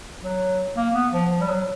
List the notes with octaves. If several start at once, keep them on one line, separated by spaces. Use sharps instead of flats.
F#3
A#3
B3
F3
F3
G3
F#3